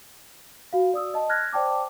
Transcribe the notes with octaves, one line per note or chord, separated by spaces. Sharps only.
F#4 F5
D5 D#6 E6
D#5 A5
F6 F#6 G#6 A#6
C5 D5 G5 A5 D6